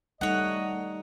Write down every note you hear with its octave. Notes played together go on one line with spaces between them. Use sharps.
G3 A3 D#4 C#5 D#5 F#5